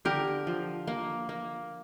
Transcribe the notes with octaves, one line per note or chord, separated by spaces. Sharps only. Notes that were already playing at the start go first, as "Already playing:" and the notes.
D3 G4 A#4
F3
A#3
A#3